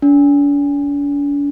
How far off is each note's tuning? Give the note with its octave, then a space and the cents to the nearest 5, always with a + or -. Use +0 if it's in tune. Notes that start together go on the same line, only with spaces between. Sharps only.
D4 -45